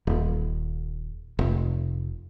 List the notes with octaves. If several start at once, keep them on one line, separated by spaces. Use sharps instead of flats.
D#1
F1